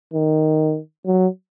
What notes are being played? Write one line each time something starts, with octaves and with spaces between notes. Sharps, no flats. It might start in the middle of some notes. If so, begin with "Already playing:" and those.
D#3
F#3